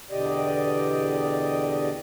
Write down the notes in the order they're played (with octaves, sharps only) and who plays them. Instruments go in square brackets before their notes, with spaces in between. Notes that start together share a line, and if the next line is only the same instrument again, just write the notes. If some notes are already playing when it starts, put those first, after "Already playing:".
[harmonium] E2 B2 D3 G4 D5 D#5